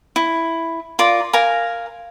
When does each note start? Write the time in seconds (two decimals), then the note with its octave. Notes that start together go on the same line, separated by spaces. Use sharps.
0.16 E4
0.99 F4 A#4 D5 D6
1.33 A#4 F5 G#5 A#5